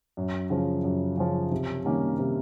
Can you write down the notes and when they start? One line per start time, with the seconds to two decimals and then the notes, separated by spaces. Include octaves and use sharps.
0.17 F#2
0.50 C#3 F3
0.84 F#2
1.17 C#3 F3
1.51 C3
1.85 D#3 G3 A#3 C#4
2.18 C3